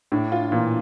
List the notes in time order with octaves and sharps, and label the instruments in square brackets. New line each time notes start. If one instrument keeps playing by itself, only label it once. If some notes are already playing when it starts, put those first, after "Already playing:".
[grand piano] A2 [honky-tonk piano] D4
[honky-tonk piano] F4
[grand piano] A#2 [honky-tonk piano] E3